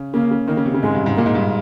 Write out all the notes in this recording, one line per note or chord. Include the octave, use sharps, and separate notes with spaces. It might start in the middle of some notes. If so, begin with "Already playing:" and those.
Already playing: C#3
C#3 A#3
C#3
D#3 A#3
C#3
C3
C#3
G#2 G#3
G2
G#2
A#2 A#3
G#2
G2